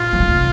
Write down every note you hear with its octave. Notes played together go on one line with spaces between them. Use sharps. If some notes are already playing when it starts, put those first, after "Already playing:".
Already playing: A#2 F4
F3
D#3
C#3
C3